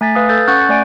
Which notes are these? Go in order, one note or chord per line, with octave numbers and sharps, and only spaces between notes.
A3 G#5 A6 B6
B4 F5 D#6
A4 G6 A6
C#4 F#5 C#6 F#6 G6 A6
A3 D5 G#5 D7